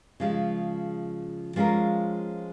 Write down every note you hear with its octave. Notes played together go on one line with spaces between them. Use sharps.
C#3 F3 G#3
F3 G#3 C#4 F4 A#4